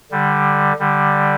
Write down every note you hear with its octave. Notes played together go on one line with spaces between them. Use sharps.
D3 G3
D3 G3